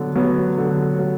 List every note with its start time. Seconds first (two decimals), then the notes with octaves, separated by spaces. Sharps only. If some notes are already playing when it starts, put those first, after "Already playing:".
Already playing: D3 F#3 B3
0.16 F#3 B3
0.58 D3
0.99 F#3